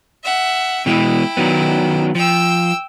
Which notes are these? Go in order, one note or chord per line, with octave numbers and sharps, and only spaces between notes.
E5 F#5
B2 E3 G#3 E4 G5
D#3 F#3 B3
F3 G5 E6